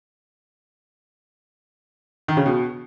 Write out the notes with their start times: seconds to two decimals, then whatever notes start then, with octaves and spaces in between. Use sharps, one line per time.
2.28 D#3
2.37 C#3
2.46 B2